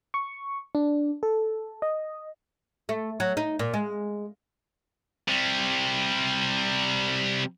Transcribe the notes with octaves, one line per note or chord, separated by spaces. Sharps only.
C#6
D4
A4
D#5
A3
F#3
D#4
A#2
G#3
C3 G3